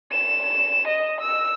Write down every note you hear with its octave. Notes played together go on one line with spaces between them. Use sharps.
E7
D#5
E6